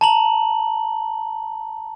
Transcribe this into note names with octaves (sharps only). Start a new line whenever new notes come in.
A5 A#5 F#7